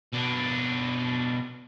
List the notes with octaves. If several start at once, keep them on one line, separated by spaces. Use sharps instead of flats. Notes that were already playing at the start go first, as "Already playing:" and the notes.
B2 D4